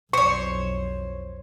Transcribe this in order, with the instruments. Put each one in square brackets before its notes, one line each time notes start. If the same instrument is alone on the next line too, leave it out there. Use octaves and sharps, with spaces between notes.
[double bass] B1 F2 [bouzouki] C5 C#5 [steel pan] C#6